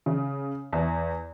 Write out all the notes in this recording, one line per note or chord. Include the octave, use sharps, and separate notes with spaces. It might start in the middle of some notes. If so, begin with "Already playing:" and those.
C#3
E2